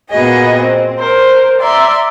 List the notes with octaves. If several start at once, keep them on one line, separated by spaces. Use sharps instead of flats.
A#2 B3 F#4 G#4 D#5
C4
A#4 C5
D5 E5 A#5 C6